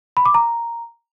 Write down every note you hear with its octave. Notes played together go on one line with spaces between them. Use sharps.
B5
D6
A#5